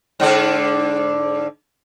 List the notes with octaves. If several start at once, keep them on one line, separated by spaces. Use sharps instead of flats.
G#2 D3 D4